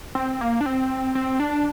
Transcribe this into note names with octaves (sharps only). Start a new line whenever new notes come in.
C4
A#3
D4
C4
C4
D4